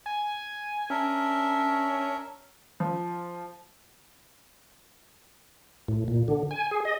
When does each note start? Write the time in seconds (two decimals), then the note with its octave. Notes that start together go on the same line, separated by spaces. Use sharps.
0.06 G#5
0.90 C#4 D4 A#4 E5
2.80 F3
5.88 A2
6.08 A#2
6.28 D3
6.51 G#5
6.71 G#4
6.85 D#5